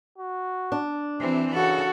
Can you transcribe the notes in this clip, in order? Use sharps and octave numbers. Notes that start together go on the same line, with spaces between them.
F#4
D4
C3 E3 C4
C#3 F#4 A4